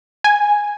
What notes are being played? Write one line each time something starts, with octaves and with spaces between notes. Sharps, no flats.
G#5